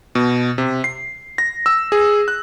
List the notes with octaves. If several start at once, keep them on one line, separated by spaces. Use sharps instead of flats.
B2
C3
C7
A#6
E6
G#4
F#6